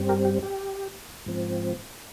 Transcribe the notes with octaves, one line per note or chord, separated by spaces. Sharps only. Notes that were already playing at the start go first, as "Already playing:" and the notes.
Already playing: G2 G3 C4
G4 A#4
G4
G4
G#2 F3 C4